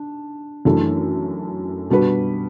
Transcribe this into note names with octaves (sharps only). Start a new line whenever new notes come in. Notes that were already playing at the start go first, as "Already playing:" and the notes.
Already playing: D4
F#2 E3 A3 D4
B2 G3 D4 F#4 B4